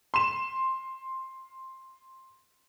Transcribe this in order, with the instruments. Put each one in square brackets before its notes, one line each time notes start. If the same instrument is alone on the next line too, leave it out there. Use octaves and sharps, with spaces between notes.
[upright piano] C6 E7